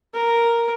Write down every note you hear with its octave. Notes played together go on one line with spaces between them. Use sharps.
A#4